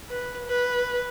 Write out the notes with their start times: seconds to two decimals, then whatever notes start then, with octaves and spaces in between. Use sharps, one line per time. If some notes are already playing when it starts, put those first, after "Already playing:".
0.10 B4
0.46 B4